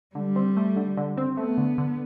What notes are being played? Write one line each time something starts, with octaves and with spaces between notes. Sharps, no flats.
D3 G3
C4
A3
D3
D3
C4
A3 B3
D3
D3